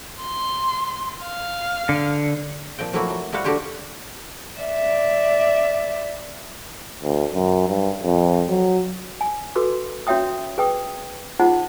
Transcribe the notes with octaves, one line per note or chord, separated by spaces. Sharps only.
C6
F5
D3
A#2 F3 C4 G5
F3 F#3 A3 A#3 E4 F#4
F#3
G3 E4 F#4 C5 F5 F#5
D3 A3 F#4 G4 C5 C#5
D5 E5
D2
F#2
G2
F2
F#3
G#5
F#4 A4 B4 D6
C#4 F#4 C#5 E5 G5 D#6
G#4 B4 G5 D#6
D#4 F4 G#4 C5 F#5